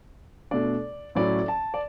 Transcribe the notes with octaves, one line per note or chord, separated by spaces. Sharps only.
B2 A3 D4 D5
A2 F#3 C#4 E4 D5
A5
D5